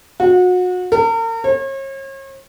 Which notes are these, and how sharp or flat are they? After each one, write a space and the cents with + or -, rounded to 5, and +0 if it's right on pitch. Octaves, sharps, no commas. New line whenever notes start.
F#4 -30
A#4 -40
C#5 -40